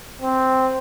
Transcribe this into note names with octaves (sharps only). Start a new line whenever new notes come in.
C4